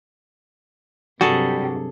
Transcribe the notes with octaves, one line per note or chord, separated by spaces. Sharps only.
G2 C3 F#3 G3 F#4 G#4 A4